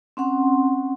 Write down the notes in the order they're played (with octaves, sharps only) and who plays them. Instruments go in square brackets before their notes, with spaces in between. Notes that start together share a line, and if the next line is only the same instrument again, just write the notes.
[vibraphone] C4 C#4 F#5 C6